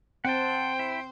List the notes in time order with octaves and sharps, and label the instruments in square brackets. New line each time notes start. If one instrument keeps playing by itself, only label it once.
[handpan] C4 [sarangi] C5 [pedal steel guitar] F#5 A5 [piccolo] G5
[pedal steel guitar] E4